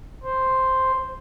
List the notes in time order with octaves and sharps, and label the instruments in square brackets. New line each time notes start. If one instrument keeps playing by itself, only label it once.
[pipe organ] C5